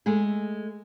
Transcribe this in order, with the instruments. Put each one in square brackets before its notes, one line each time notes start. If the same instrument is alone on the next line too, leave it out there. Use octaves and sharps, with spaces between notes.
[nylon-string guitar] G#3 A3 G#4